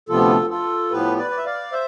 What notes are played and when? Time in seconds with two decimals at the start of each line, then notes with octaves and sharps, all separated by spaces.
0.09 D2 C3 F3 B3 F4 A4
0.50 F4 A4
0.91 A2 F3 B3 G4 B4
1.18 B4 D5
1.30 D5
1.37 E5
1.46 D5 F5
1.72 C5 E5